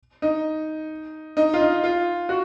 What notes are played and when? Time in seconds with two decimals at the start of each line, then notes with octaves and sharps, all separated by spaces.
0.22 D#4
1.37 D#4
1.54 F4
1.61 D#4
1.84 F4
2.29 F#4